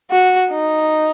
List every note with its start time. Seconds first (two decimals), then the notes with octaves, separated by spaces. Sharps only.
0.11 F#4
0.50 D#4